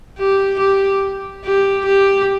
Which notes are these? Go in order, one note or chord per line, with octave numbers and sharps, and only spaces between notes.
G4
G4
G4
G4